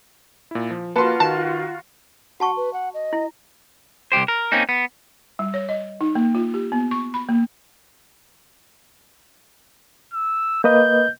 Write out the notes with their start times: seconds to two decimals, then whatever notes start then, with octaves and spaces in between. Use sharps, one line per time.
0.51 A#2 E4
0.71 F3
0.96 A#3 F4 F#4 B4 A5 C6 C#7
1.20 D#3 A5
2.40 F#4 F#5 A5 C#6
2.57 B4
2.73 F#5
2.94 D#5
3.13 E4
4.12 C2 G#2 G4 C5
4.28 A#4
4.52 A#3 C4 C#4 D#4
4.69 B3
5.39 G3
5.54 C#5
5.69 D#5
6.01 D#4
6.15 A#3
6.35 F4
6.54 G4
6.72 B3
6.91 C#6
7.14 B5
7.29 A#3
10.13 E6
10.64 A#3 B4 D#5 G6